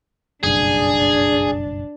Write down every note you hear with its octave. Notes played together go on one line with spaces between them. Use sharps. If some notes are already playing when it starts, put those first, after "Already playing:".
F#1 B1 G2 D4 G#4